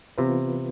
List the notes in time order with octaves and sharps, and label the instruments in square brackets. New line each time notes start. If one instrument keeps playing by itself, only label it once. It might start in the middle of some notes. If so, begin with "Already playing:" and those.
[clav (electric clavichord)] C3 [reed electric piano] E3 B3 F4 B4